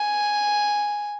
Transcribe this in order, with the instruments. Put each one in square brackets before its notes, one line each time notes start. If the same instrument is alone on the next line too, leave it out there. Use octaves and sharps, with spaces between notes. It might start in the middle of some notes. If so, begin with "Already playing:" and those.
Already playing: [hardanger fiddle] G#5